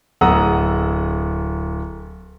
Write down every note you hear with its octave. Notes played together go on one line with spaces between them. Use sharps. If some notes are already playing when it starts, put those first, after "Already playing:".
D1 G#4 F#5 A#5 D#6 E6